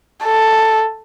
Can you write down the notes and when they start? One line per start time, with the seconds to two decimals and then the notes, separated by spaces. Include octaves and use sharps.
0.24 A4